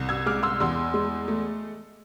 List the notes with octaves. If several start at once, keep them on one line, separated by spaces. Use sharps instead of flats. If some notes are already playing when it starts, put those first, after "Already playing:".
Already playing: C2
E6 G#6
G#3 D6 F6
C6 E6
E2 C6 E6
G#3
A3